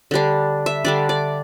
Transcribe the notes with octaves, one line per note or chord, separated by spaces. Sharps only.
D3 G3 D4
E5
D3 G3 D4 D5
D5